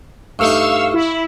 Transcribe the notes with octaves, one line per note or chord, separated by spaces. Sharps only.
G2 A3 D#4 F5 C#6 E6
E4